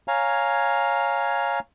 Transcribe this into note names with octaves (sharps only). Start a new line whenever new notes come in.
C#5 F5 G#5 A#5